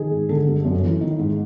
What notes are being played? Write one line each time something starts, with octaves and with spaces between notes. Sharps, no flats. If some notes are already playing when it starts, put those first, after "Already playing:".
Already playing: D#3 G#4
G#2
D3 A4
G2
F#2
E3
D#3
G#2